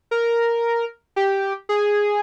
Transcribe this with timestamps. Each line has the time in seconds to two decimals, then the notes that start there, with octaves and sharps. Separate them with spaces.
0.11 A#4
1.16 G4
1.69 G#4